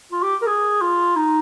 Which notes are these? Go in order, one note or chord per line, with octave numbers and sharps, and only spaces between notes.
F4
G4
A#4
G#4
F4
D#4